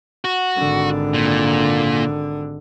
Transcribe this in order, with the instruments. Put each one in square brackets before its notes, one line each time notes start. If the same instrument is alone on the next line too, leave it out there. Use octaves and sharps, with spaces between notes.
[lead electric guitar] F#4
[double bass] G#1 D3
[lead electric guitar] A#2